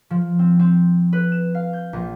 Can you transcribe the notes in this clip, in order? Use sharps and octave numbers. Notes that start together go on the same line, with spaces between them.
F3
C4
C4
B4
E7
F5
G6
A#1